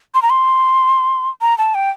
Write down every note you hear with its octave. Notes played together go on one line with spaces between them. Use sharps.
C6
A#5
C6
A#5
A5
G5